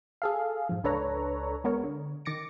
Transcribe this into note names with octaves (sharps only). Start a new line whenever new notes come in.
G#4 A4 F5
G#2 F3
C#2 D4 A4 B4 C#5 A#5
G#3 B3 A#4 C#5
D3
D#3 D6 A6 A#6 C#7 D7